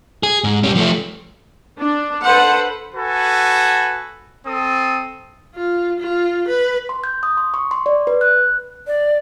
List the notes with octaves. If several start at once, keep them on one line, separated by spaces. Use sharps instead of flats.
G#4
G#2
G3 C#4
F3 A3
D4
A4 B4 C5 F#5
F#4 A4 B4 G#5
C4 A4 D#6
F4
F4
B4
C6
G6
D#6
C6
C#6
C6
D5
B4
F#6
D5